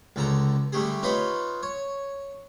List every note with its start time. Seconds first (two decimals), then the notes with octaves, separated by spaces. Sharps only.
0.16 C#2 D3 A4 A#5
0.72 D3 G3 A3 G4 G#4
1.03 D#4 F4 B4 C#5 D#5 B5
1.63 C#5